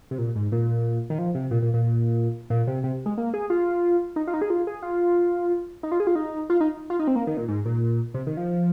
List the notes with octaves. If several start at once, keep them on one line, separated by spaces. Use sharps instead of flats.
C3
A#2
G#2
A#2
D#3
F3
C3
A#2
A#2
A#2
A#2
C3
C3
G#3
A#3
G#4
F4
D#4
F4
D#4
G#4
F4
G#4
F4
D#4
F4
G#4
F4
D#4
F4
D#4
F4
D#4
C4
A#3
D#3
A#2
G#2
A#2
C3
D#3
F3